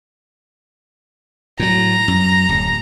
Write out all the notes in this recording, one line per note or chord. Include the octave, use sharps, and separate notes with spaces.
A2 F#3 A#5
F#2
D1